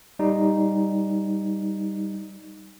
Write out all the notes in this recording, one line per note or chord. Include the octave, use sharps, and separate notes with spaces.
G3 D#4